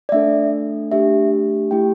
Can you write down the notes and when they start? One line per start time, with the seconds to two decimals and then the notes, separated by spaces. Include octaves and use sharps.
0.09 D5
0.12 A3 D4 A4 E5
0.92 A3 D4 G4 E5
1.71 A3 E4 G4 G5